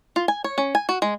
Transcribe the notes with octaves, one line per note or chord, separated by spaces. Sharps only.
F4
G#5
C#5
C#4
G#5
F#4
G#3